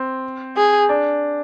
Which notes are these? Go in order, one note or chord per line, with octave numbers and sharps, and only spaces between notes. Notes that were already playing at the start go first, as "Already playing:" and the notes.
Already playing: C4
G#4
D4